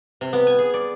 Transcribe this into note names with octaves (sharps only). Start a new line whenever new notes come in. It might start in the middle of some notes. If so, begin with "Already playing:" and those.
C3
B3
G#5
G#4
D5